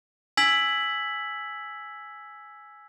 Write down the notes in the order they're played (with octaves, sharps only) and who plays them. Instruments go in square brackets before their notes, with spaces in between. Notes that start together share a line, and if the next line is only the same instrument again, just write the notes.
[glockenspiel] G#5 E6 G#6 B6 F#7